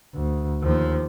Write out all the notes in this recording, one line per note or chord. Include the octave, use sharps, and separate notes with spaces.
D2
D#2 F3